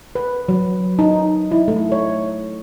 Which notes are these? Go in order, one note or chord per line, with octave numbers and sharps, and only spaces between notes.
B4
F#3
D#4
E4
A3
C#5